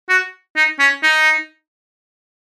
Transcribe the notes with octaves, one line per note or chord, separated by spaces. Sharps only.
F#4
D#4
C#4
D#4